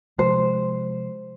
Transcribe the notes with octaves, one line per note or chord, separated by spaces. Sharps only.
C3 F3 G#3 C5